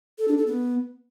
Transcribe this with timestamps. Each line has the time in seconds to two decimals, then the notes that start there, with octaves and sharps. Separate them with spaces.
0.19 A4
0.28 D4
0.37 A4
0.47 B3